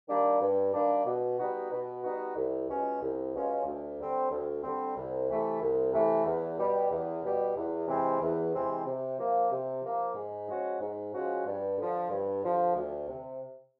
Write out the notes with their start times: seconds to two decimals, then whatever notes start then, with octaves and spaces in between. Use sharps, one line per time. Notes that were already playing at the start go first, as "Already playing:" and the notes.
0.08 D#3 G3 A#3 D4
0.41 G2
0.73 D#3 G3 A#3 D4
1.05 B2
1.38 G3 B3 D#4 F#4
1.71 B2
2.04 G3 B3 D#4 F#4
2.36 C2
2.68 B2 G#3 C#4 F4
3.01 C2
3.33 B2 G#3 C#4 F4
3.65 D2
3.99 D3 G3 C4
4.31 D2
4.63 D3 G3 C4
4.96 C2
5.28 C3 E3 A3
5.60 C2
5.92 C3 E3 A3
6.25 E2
6.57 B2 G3
6.90 E2
7.23 B2 G3
7.56 E2
7.87 C3 E3 G#3 C4
8.20 E2
8.53 C3 E3 G#3 C4
8.86 C3
9.18 F3 A#3
9.51 C3
9.82 F3 A#3
10.15 G#2
10.48 F3 G#3 C#4 F#4
10.80 G#2
11.13 F3 G#3 C#4 F#4
11.46 G2
11.77 D3 F3
12.10 G2
12.42 D3 F3
12.74 D2
13.07 C3